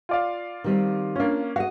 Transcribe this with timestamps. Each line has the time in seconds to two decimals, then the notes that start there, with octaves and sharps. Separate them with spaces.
0.09 F4 D5 F5
0.64 D#3 G3 C4
1.16 A#3 C#4 D4 F4
1.56 F#4 D#5 F5